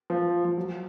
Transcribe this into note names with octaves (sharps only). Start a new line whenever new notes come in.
F3
F3
F#3